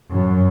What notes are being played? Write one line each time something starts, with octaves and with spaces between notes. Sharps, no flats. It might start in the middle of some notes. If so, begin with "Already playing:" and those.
F#2